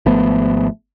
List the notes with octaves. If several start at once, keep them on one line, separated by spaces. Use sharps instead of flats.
G#1 F3 A3 B3